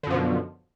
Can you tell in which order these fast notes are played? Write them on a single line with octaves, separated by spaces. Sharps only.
D3 F#2 F3 B2